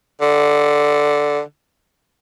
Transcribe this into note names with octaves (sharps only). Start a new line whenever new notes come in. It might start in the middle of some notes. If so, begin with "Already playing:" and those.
D3